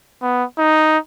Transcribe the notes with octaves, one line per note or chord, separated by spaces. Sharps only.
B3
D#4